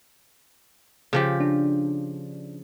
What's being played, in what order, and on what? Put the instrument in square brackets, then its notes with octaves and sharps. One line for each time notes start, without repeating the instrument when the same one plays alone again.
[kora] C#3 F3 G4
[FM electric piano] D4